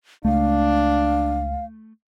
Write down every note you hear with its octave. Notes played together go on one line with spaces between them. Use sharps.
C#2 A3 D4 F5